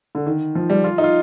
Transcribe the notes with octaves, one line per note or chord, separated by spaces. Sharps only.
D3
D#3
F3
G3
F4
D#4
F4